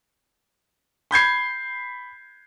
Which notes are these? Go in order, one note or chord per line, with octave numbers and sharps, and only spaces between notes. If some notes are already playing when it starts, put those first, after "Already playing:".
B5 G6 G#6 C7